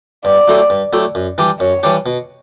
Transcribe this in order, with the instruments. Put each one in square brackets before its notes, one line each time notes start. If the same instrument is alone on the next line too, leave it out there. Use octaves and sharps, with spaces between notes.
[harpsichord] G2 [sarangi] D5
[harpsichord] F#3 A3 E4 G4
G2
F#3 A3 E4 G4
F#2
E3 G3 D4 G4
[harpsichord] F#2 [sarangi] C#5
[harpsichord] E3 G3 D4 G4
B2